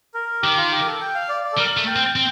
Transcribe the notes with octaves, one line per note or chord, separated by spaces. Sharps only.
A#4
D#3 G4
F4
G4
A#4
A4
G5
F5
D5
D5
A4
G3 A#4
A3
G5
C4
C4 G5